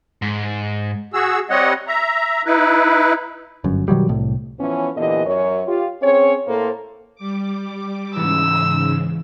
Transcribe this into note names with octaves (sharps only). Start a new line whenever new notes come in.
G#2
F#4 G#4 E6
G3 C4 C#5 D#5 F#5
E5 A#5
D#4 E4 B4
G1 F#2
B2 D#3 F#3 G3
C2 A2
E3 F3 B3 C#4
A#2 D3 E3 B3 G4 D#5
F#2 C#5
F4 G4
C4 C#4 G#4 C#5
A2 A#3 A4 C5
G3 D6
G#2 C#3 E3 B3 E6